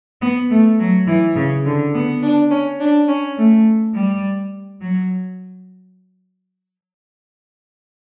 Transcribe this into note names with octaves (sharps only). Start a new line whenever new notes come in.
B3
A3
F#3
E3
C#3
D3
B3
D4
C#4
D4
C#4
A3
G3
F#3